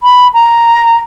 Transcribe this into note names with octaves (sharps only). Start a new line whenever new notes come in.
B5
A#5